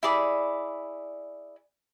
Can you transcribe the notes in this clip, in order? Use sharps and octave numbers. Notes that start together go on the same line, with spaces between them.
E4 G#4 D5 B5